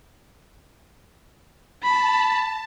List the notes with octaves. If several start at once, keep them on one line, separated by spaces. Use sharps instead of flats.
A5 B5